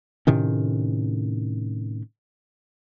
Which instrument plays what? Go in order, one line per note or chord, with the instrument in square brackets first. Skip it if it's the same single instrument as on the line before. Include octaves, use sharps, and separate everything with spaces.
[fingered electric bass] A2 C3 D#3 C#4